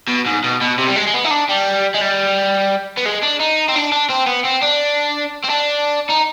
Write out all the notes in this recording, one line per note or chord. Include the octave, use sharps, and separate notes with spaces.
B2
G#2
B2
B2
C3
G3
G#3
G#3
B3
D#4
D4
G3
G#3
G3
B3
G#3
D4
D#4
C4
D4
D4
C4
B3
C4
D4
C4
D4
D#4